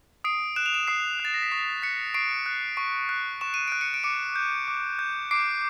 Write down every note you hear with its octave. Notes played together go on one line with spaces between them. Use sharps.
D#6 C7 D7
F#6 E7
F7
D7 E7
D#6 C7
F#6
A6
A#6
B6
C#6 C7
F#6 B6 C#7
C#6 C7 D7
F#6
C#6
F#6
C#6 E7
D#7
F#6 D7
C#7 D#7
D7
D6 C#7 D#7
G6
D6
G6
D6 C7 D7